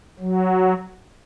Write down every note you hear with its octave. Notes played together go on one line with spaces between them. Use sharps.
F#3